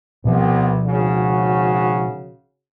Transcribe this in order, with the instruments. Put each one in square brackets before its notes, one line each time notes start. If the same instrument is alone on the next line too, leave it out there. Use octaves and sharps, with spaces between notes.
[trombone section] C2 B3 [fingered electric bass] B2 F3
[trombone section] G#1 C#3 F#4